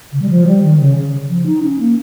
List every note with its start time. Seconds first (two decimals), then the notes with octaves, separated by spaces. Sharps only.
0.12 C#3
0.21 G3
0.29 F3
0.46 G3
0.62 D#3
0.79 C#3
0.97 C#3
1.29 F3
1.46 D#4
1.63 C#4
1.79 A#3